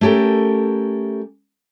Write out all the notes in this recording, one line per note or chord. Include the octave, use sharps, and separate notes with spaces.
A3 C#4 G4 A4 A#4